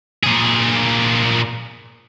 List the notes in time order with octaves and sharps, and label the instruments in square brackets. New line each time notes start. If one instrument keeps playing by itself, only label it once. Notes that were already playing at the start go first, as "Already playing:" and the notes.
[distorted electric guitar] A#2 G#4